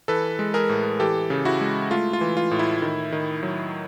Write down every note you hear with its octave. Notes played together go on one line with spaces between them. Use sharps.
E3 A4 B4
G#3
G#4 A#4
A2
E3 G4 A4
C#3
E4 F#4
G#3
A3 F4
F4
E3
F4
A2
E4
D#3
D#3
F#3